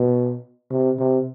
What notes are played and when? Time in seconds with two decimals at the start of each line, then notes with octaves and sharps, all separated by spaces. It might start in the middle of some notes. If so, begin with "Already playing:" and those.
Already playing: B2
0.71 C3
0.99 C3